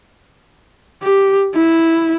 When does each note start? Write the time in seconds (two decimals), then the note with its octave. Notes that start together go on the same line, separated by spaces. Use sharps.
1.03 G4
1.55 E4